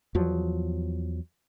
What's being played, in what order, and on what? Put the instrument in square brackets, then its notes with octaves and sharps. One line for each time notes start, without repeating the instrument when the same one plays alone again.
[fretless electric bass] E2 F3 F#3